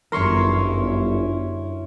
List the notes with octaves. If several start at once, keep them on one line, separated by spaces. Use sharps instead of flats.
G1 F#2 C#4 E4 A#4 C6 C#6